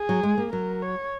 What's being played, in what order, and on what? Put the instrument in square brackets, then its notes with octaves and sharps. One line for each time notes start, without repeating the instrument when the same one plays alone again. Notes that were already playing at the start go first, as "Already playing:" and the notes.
Already playing: [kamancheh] G#4
[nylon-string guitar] F#3
G#3
A#3
[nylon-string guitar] F#3 [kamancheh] A#4
[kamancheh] C#5